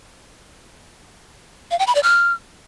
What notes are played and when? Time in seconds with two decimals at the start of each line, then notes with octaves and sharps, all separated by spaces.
1.71 F5
1.79 G5
1.87 B5
1.95 D5
2.03 F6